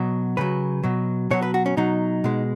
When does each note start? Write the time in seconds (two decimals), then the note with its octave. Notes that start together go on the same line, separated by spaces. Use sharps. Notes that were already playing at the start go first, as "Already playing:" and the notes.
Already playing: B2 F#3
0.37 C#3 F#3 B4
0.84 B2 F#3
1.31 B2 F#3 C#5
1.42 B4
1.54 F#4
1.66 C#4
1.77 B2 F#3 D#4
2.24 B2 G#3